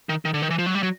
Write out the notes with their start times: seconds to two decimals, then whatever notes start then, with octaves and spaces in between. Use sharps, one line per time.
0.09 D#3
0.25 D#3
0.34 D3
0.42 D#3
0.50 E3
0.58 F3
0.66 F#3
0.75 G3
0.83 F#3